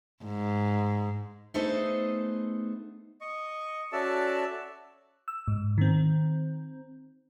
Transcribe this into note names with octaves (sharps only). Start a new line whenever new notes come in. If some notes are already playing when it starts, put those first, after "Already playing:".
G#2
A3 B3 D#4 G#4 A4 C5
D#5 C#6
C#4 F#4 A4 D5 E5 A5
E6
G#2
D#3 C4